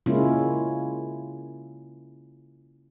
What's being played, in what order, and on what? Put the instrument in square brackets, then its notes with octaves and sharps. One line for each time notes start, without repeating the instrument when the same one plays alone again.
[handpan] C#3 G#3 A#3 C#4 E4 F4